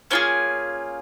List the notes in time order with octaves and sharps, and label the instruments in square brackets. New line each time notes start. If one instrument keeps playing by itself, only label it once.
[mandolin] A#3 C#4 F4 G#4 G#5